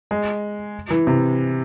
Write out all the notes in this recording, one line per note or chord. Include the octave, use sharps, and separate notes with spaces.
G#3
E3
C3